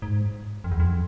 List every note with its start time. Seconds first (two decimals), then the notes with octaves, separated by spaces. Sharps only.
0.02 G#2
0.64 F2
0.71 E2
0.80 F2